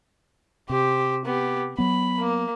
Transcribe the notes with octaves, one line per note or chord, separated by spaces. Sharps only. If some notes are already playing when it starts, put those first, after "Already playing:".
C3 G4 C5
B3 G4
F#3 B3 B5
A#3